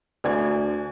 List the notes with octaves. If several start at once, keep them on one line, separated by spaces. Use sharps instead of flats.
D2 D4 G#5 G#6